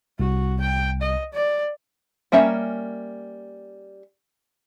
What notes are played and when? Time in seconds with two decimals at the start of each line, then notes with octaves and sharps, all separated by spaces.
0.20 C2 F#4
0.61 G5
1.02 D#5
1.34 D5
2.32 G3 A#3 C#4 E5 A#5